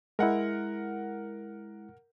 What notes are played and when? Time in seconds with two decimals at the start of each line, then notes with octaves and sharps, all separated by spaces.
0.19 G#3 E4 A#4 F#5